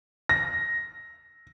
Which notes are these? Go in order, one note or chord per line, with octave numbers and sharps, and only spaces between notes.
A#6